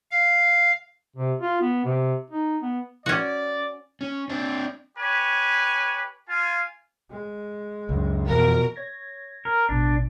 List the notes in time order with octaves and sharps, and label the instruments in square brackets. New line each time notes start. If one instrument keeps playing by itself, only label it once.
[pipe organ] F5
[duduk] C3
F4
B3
C3
D#4
B3
[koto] C#4 F#4 [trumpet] D5
[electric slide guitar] C#4
C4 D4
[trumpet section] G4 B4 C#5 G#5
F4 G#5
[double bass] G#3
[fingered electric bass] C#2 F#2
[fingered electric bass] F2 E3 F3 [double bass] B2 [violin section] A#4
[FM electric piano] C#5 G#6 A#6
[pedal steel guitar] A#4
[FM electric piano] A1 B2 [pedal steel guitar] D4